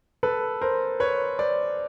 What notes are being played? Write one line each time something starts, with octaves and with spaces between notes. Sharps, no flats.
A4 B4
A#4 C5
B4 C#5
C5 D5